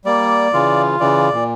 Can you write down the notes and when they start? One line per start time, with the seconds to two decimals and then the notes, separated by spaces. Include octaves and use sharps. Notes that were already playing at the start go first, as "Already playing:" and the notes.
0.05 G3 A#3 D5
0.53 C#3 E3 F4
1.00 C#3 E3 D5
1.32 A#2